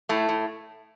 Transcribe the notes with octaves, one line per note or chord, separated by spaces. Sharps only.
A2 A3
A2